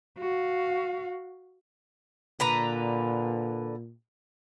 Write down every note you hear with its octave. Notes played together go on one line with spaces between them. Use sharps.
F#4 F5
A#2 D3 B4 A#5